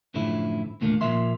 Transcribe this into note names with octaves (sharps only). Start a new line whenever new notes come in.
F#2 A2 D3 F3 E4
E2 A#2 D3 A3 A#3
A#2 F3 A#3 E5 C6